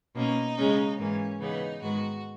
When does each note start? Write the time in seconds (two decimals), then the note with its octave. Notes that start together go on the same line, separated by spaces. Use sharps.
0.15 B2 A#3 C#4 D#4
0.57 C#3 G#3 C#4
0.99 G#2 E3 A#3 C#4
1.41 C#3 E3 B3 D#4
1.82 G#2 D#3 G#3 B3 F#4